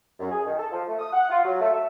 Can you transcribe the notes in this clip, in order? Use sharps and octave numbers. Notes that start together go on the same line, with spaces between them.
F#2
G#4
D#3
A4
F3
A3
D#6
F#5
F4
F#3
A3
E5